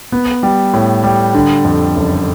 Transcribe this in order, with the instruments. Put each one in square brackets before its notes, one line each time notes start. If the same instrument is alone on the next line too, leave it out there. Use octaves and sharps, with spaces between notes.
[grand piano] B3
G3
A2
G3
D3
F2
F#1